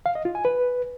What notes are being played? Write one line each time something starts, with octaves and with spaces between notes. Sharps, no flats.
F5
D#5
F4
G#5
B4